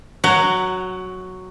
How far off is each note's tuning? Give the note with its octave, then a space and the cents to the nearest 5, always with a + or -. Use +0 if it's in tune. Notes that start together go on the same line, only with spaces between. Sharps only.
F#3 +0 F#5 +25 A#5 +0